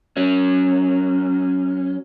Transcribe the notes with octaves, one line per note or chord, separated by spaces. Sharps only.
F#3 C#4